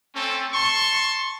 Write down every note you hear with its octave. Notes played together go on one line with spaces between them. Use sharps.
A3 C4 C#4 A4
A5 C6 C#6